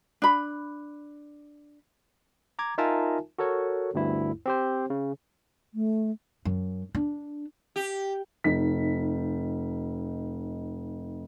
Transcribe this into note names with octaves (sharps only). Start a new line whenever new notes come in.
D4 B5
A#5 D6 G#6
D#4 F4 A#4 E5 G#5 A5
F#4 A4 A#4 C#5
G1 D2 G2 E4
C4 G4 C5
C#3
A3
F#2
D4
G4
F1 D#4 B6